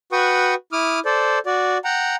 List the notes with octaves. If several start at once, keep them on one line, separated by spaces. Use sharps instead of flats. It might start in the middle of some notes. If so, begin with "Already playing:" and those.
F#4 B4 G5 C#6 D#6
E4 D6 D#6 F6
A4 C5 D5
F#4 D5
F#5 G5 A#5